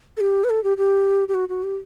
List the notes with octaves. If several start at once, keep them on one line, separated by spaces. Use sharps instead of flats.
A4
G4
B4
A4
G4
G4
G4
F#4
F#4
G4